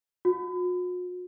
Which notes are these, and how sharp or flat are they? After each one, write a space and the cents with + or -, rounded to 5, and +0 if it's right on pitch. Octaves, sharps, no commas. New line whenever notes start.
F#4 -45